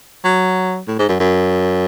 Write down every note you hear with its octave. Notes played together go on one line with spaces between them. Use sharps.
F#3
A2
G#2
F#2
F#2